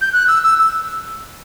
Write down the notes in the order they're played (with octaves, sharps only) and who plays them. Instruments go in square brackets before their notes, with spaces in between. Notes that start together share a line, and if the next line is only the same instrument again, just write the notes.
[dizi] G6
F#6
E6
E6
E6